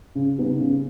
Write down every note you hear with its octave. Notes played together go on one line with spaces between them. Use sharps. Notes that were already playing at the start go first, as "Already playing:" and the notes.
C#3
G3 B3 D#4
C#3